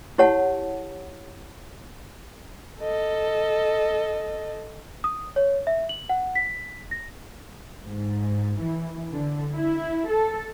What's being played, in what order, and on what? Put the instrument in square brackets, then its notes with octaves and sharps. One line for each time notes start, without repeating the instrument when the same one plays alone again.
[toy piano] E4 G4 C#5 F#5 A5
[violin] A4 D#5
[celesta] D#6
C#5
E5
F#7
F#5
B6
A#6
[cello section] G#2
E3
D3
E4
A4